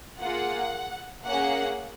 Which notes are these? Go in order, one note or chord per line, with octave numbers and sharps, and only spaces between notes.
A#3 F4 G#4 F#5
A#3 C#4 G#4 F#5